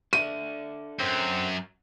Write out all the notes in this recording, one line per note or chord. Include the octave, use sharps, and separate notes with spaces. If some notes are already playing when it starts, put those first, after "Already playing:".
D4 A4 E5 D#7
F#2 C4